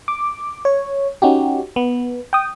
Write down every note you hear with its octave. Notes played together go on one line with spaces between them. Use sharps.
D6
C#5
C#4 D#4 F#4 G4
B3
G5 D#6